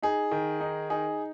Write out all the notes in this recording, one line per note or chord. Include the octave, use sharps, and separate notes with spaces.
D#4 G#4
D#3
D#4
D#4 G#4